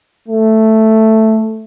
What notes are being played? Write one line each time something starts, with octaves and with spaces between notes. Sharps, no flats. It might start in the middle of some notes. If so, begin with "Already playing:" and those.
A3